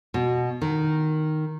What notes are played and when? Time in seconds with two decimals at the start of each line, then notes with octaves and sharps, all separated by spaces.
0.14 B2
0.62 D#3